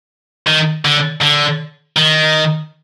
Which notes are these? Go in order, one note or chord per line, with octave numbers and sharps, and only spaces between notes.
D#3
D3
D3
D#3